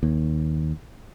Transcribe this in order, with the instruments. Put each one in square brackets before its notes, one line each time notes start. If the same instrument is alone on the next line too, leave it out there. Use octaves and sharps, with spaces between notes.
[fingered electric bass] D#2